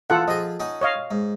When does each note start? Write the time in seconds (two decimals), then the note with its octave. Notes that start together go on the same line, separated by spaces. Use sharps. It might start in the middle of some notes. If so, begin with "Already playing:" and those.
0.10 E2 F4 A4 F#5
0.28 F3 G#4 D#5
0.60 C#4 D#4 F#5
0.81 C#5 D#5 F5
1.11 G#2